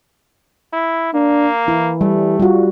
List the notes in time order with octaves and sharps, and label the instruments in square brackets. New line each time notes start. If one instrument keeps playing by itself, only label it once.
[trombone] E4
[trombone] A#3 [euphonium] D4
[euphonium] E3 [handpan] E4
[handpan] G3 [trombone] A3
[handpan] G3 F#4 [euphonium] F4